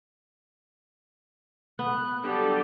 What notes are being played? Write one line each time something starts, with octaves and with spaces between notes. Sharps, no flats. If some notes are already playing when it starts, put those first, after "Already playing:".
B3 F#6
D3 F#3 G3 G4 A4 D5